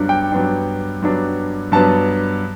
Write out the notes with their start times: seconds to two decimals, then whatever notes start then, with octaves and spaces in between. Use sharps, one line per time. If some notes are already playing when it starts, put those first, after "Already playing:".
Already playing: G2 F#3 B3 D4
0.09 G5
0.32 G2 F#3 B3 D4
1.02 G2 F#3 B3 D4
1.72 G2 F#3 B3 D4 A5